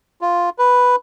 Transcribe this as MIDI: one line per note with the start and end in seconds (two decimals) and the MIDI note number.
0.21 0.50 65
0.58 0.96 71